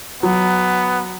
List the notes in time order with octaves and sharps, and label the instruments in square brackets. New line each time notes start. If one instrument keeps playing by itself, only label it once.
[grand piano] F#3 [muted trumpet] B3